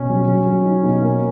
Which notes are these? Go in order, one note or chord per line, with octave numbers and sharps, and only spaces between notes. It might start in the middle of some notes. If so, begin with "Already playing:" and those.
Already playing: B2 C#4
F#3
F#3
F#3
D#4
B2
A#3